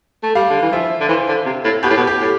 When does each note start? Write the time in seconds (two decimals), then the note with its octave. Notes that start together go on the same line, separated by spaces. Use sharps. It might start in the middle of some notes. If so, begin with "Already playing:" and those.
0.23 A3
0.35 G3 F5
0.50 D3
0.62 E3
0.72 F3 E5
1.01 D3
1.09 E3 C5
1.28 D3
1.46 C3
1.64 A2
1.83 B2 G4
1.90 A2
1.97 B2
2.07 G4
2.19 A2